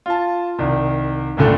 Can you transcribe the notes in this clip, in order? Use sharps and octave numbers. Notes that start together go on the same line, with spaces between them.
F4 A5
C2 D#3
C#2 G2 A#2 D3 A3